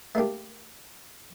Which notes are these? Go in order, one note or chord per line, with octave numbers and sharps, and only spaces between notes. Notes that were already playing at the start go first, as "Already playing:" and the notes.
A3 A#3 D4 G4